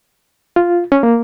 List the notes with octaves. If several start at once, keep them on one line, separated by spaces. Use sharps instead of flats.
F4
C#4
A#3